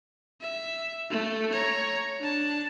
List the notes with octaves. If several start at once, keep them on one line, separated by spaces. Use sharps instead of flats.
E5
A3
C#5 A#5
D4 A5